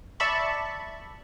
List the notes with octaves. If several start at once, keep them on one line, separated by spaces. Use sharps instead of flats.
D5 E5 A5 B5 C#6